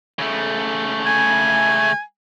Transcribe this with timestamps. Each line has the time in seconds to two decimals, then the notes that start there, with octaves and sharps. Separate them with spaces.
0.19 C#3 A3
1.06 G#5